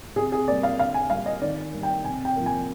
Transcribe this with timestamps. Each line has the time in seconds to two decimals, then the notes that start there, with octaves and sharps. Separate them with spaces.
0.16 C3 G#4
0.32 G#4
0.47 A#3 D5
0.52 G3
0.63 F5
0.79 D3 F5
0.94 G#5
1.10 G3 A#3 F5
1.26 D#5
1.42 D#3 D5
1.73 G3 A#3
1.83 G5
2.04 C3 G#5
2.25 G5
2.36 F3 A#3
2.46 G#5